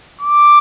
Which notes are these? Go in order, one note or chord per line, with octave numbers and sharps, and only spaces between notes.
D6